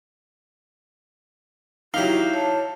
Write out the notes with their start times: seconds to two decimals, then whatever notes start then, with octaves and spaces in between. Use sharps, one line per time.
1.94 F#3 D#4 E4 F#4 G4 F5
2.34 C#5 A5